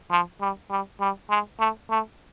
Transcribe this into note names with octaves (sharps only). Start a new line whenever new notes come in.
F3
G3
G3
G3
G#3
A3
A3